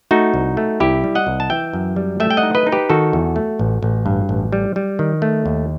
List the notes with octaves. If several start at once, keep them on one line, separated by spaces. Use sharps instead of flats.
A3 D#4 F#4
C2
A3
C2 E4 G4
G3
D#5 F#5
C2
A5
E3 E5 G5
F#2
G3
A3 E5 G5
G5
D#5 F#5
D#4
B4 D#5
D#4
G4 B4
D#3 F#4 A4
E2
A3
A1
A1
G2
A1
G3
G3
D#3
A3
D#2